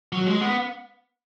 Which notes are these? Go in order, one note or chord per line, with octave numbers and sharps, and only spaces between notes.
F#3
G#3
B3